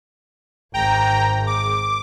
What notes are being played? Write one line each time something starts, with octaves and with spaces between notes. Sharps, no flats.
G#1 G#2 G5 A#5
D6